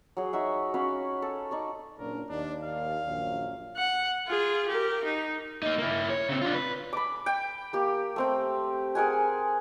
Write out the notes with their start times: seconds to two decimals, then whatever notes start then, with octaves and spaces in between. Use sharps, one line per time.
0.17 F#3 G#4
0.33 D#4 F#4 E5
0.74 C#4 F#4 F5 B5
1.22 A4
1.51 D#4 D5 C#6
1.99 F#1 A#2 D4 A#4
2.29 D#2 D4 D5
2.64 F5
3.07 A#1 F#2
3.77 F#5
4.27 F4 G#4
4.68 G4 A#4
5.04 D#4
5.63 A#3 D#4
5.79 A#3 E4
6.10 C#5
6.28 C#3 C4
6.42 D4 F4
6.54 B4
6.93 B5 D6
7.26 G5
7.73 A#3 G4
8.16 A3 C4 G5
8.95 G#4 A#4 F#5 G#5